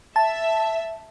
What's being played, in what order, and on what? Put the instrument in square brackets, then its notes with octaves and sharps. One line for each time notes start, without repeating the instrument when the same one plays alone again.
[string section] E5 [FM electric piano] A5